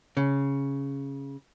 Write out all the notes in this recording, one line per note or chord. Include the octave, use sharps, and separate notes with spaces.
C#3